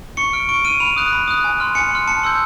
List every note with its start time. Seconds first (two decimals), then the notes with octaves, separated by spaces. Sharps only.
0.17 C#6 C#7
0.33 F6 D7
0.49 C#6 D7
0.65 F6 D#7
0.80 B5 F7
0.96 D#6 F#6
1.13 B5
1.28 D#6 F#6
1.44 G#5
1.60 C6 F6
1.75 G#5 C#7
1.91 C6 F6
2.07 A5 C#7
2.23 C6 E6 G6